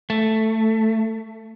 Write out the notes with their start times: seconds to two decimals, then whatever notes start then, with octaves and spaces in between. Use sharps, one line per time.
0.10 A3